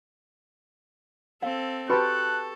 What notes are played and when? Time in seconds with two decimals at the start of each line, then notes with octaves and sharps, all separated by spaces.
1.42 C4 A4 F5
1.89 F#4 G4 A4 B4 A5 B5 C#6 F#6